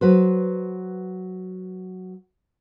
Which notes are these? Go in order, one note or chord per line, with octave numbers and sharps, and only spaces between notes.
F#3 B4 C5